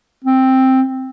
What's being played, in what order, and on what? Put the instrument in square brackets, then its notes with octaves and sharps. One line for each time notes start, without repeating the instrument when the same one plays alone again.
[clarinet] C4